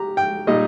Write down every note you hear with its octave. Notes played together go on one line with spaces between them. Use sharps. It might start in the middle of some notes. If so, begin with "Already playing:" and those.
Already playing: G4 A#5
G5
A#2 G3 D#4 D#5